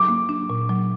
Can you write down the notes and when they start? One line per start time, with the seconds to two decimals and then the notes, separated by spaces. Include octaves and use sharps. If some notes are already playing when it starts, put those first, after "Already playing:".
Already playing: F#3 D6
0.08 A#3
0.29 D4
0.50 A#2
0.69 F#3